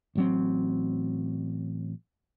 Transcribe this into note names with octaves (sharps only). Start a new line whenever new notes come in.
A1 F#3 C4